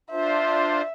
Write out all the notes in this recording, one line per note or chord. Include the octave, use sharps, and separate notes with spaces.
D4 F4 C5 E5